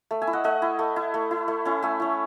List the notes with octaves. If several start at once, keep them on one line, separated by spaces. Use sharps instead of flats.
A3
E5 G#5
E4
D#5 F#5
A3 D#5 F#5
E4
A3
E4
A3
E4
A3
C#4 E4
A3 E5 G#5
C#4 E4